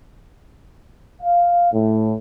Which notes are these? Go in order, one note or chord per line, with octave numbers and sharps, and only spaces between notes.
F5
A2